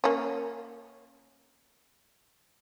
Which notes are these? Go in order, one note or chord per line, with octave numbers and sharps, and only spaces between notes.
A#3 C#4